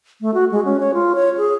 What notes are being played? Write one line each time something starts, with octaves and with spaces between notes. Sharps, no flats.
A3
F#4
G#3
C#4
C#5
F4
C#5
G#4